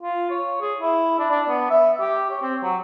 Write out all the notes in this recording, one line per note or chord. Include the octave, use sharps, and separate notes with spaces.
F4
C#5
G#4
E4
D4
D4
B3
E5
G4
C#5
C4
F#3